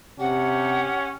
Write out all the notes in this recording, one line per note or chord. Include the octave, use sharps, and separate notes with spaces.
C3 C#4 G4 F#5